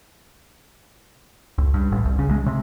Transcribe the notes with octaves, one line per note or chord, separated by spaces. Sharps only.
C#2
G2
A1
C2
C#3
G#3
C3